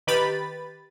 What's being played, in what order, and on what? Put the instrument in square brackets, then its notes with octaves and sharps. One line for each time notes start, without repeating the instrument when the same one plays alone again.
[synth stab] D#3 G4 B4 B5 A6